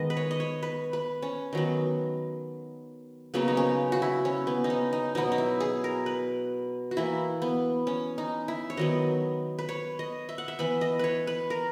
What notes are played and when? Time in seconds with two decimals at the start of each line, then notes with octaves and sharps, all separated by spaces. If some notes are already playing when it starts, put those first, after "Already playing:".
Already playing: D#3 G#3 B3 D#5
0.10 B4
0.17 C#5
0.31 D#5
0.40 C#5
0.63 B4
0.93 B4
1.22 C#4
1.53 D#3 F#3 B3
3.34 C#3 F#3 A#3 B3
3.48 D#4
3.57 C#4
3.92 F#4
4.02 E4
4.25 C#4
4.47 B3
4.64 D#4
4.70 C#4
4.93 D#4
5.15 B2 F#3 B3 D#4
5.32 D#4
5.38 E4
5.60 G#4
5.84 A#4
6.06 B4
6.91 F#4
6.97 E3 A#3 E4
7.42 B3
7.87 C#4
8.18 D#4
8.48 E4
8.70 C#5
8.77 D#3 F#3 B3 D#5
9.58 B4
9.69 C#5
9.99 D#5
10.29 E5
10.38 F#5
10.48 E5
10.59 E3 B3 B5
10.81 D#5
10.99 B4 C#5
11.27 B4
11.50 A#4